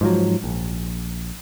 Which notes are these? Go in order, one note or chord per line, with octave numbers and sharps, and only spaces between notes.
G#2 F3 F#3
A#1